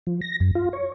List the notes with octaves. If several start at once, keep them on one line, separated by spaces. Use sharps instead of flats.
F3
A#6
F#2
F4
C#5